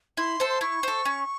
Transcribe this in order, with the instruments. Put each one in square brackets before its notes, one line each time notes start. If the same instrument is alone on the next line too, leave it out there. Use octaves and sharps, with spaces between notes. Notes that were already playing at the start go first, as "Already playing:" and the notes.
[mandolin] E4 [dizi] C6
[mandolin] A4 C5
[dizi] C6
[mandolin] E4 [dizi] C#6
[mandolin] A4 C5
C#4